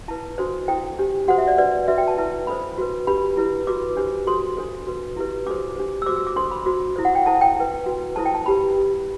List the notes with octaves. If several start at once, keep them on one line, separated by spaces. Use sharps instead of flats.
E4 B4 A5
D4 F#4 A4 C5
E4 A4 C5 G5
D4 G4 C5
F#4 A4 C5 F#5
E5
D5
D4 F#4 B4 D5
D4 F#4 B4 E5
G5
A5
E4 B4
D4 A4 C5 B5
F#4 B4
D4 G4 B4 B5
E4 B4
F#4 B4 D6
D4 G4 C5
F#4 A4 C5 C6
D4 A4 C5
F#4 B4
E4 G4 B4
D4 F#4 A4 C5 D6
D4 G4 C5
E6
F#4 A4 C5 D6
E6
D6
D4 A4 C5 C6
B5
F#4 C5
E4 A4 C5
F#5
G5
E4 A4 C5 A5
G5
E4 B4
F#4 B4
E4 A4 C5 A5
G5
A5
E4 G4 B4 B5